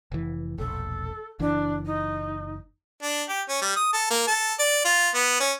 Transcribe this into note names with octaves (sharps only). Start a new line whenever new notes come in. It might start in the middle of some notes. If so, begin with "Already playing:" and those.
F1 E3
E1 A#1 A4
F#1 E3 D4
D#4
D4
G4
C#4
G3
D#6
A4
A#3
A4
D5
F4
B3
C#4